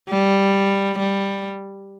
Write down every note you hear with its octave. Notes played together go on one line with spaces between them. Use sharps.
G3
G3